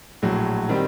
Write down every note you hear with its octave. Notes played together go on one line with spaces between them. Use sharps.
A#1 A2 F#3
D#3 G3 C4